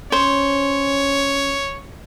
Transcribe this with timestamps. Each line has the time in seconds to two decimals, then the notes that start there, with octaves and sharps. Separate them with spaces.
0.12 C#4 C5 C#5